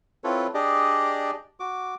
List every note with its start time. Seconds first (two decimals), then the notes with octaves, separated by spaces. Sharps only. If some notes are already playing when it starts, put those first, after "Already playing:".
0.24 C4 E4 F4 A4 B4 C#5
0.54 D4 G4 G#4 D5 D#5
1.60 F#4 D6